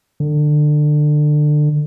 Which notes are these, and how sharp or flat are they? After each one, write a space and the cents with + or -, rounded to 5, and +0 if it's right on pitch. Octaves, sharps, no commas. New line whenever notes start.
D3 +25